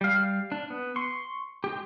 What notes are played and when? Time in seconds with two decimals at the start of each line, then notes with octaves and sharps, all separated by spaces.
0.01 G3 F5
0.52 D4
0.70 B3
0.96 C6 C#6
1.64 G#3 G4